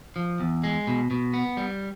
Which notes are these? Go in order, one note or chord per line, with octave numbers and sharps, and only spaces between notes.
F3
E2
G#3
B2
B2
B3
G3